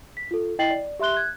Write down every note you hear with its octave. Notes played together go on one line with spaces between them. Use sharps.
B6
F4 A4
E4 D#5 G5 A6 C7 F#7
D5
G4 E5 C6 F#6 G7
F#6 G#6